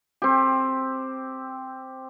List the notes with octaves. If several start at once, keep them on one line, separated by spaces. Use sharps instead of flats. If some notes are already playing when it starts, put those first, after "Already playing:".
C4 G4